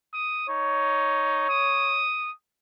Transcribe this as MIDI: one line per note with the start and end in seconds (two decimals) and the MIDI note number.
0.14 0.46 87
0.49 1.44 63
0.49 2.06 73
1.49 2.31 87